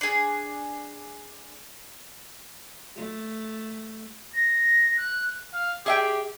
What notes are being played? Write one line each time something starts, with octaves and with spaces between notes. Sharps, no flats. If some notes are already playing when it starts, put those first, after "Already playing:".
D4 G#4
A3
A#6
F#6
F5
G4 G#4 E5 G5